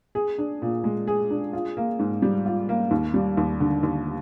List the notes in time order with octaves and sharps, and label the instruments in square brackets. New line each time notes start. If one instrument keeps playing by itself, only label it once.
[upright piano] G#4
D4
A#2
G#3
G#4
D4
F4
A#3
G#2
G3
F4
A#3
D#2
G3
D#2
D3
D#2